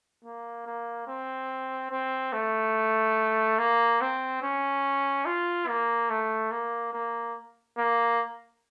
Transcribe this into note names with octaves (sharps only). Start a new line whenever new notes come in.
A#3
A#3
C4
C4
A3
A#3
C4
C#4
F4
A#3
A3
A#3
A#3
A#3